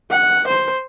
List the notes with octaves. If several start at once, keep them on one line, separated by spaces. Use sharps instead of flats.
F#5
C5